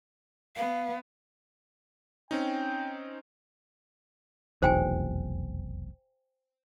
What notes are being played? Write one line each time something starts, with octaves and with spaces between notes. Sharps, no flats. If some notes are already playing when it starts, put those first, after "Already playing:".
B3 F5
C4 C#4 D#4 G5
F1 B1 E2 C5 G5 G#5